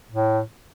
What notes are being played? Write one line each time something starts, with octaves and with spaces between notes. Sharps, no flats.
A2